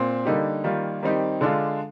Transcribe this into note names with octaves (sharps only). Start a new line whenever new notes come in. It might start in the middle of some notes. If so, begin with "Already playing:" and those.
Already playing: A#2 C4
D3 G3 A#3 D#4 G4
D#3 G3 A#3 F4
D#3 G3 C4 D#4 G4
D3 G#3 D4 F4